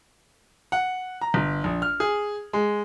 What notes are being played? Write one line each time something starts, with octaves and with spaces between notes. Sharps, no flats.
F#5
A#5
G1
A#1
F6
G#4
G#3